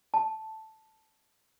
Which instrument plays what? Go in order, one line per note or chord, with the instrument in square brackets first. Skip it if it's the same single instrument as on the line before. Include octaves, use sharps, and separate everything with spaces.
[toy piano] A5